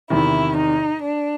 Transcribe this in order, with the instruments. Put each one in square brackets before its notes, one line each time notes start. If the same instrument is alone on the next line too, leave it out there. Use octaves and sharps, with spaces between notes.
[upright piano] E2 C3 D#3 [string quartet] E4
[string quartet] D#4
D4